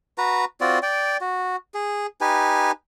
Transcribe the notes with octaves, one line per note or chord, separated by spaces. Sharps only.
F#4 B4 A#5
C4 F4 F#4 D5
D5 G5
F#4
G#4
D#4 G4 B4 G#5